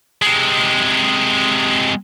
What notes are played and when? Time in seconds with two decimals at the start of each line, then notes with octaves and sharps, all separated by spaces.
0.22 C3 G#3